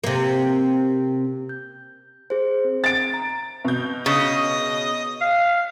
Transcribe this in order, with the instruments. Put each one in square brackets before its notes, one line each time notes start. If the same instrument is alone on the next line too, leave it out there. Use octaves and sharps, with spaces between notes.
[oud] C3 A#3
[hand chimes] G6
G#4 C5
C4
[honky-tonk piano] A6 D7
[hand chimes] A#5
[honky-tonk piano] B2 G6
[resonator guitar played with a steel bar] C#3 [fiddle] D#5
[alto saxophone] F5